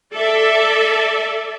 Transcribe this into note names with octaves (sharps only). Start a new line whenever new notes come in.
A4 D5 E5